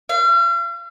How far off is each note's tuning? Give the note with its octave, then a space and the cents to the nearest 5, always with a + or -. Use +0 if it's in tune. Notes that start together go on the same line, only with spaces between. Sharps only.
F5 -40